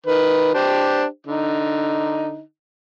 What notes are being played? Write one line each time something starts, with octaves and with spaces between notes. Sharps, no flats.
D#3 B4
D4 G4 C5
D3 D#4